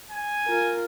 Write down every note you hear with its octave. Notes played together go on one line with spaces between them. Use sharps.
G#5
F4 A#4